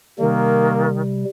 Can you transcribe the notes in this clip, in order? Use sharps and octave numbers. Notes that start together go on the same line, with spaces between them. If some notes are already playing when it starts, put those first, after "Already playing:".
C3 D#3 G3 A#3